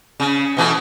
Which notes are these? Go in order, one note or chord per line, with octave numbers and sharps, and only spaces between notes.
C#3
B2 E3 A3